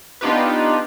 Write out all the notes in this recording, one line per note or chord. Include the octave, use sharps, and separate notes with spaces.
B3 D4 D#4 F4 G4 B4